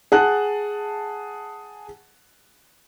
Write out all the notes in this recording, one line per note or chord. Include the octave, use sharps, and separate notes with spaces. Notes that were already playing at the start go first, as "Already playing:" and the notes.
G#4 F#5 A5 F#6